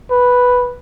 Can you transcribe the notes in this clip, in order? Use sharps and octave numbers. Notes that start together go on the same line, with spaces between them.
B4